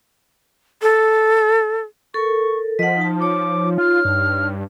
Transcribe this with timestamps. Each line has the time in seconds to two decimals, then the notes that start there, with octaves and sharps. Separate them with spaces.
0.82 A4
2.14 A4 A#4 C#6
2.79 F3 D#5 F#5 B6
2.97 D#4 A5
3.21 D#4 C#5 D6
3.78 F4 F6
4.05 G2